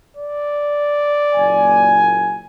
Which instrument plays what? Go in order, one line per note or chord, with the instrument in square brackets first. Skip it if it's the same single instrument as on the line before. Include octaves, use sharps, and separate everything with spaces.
[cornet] D5
[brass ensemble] F#1 A#2 G#5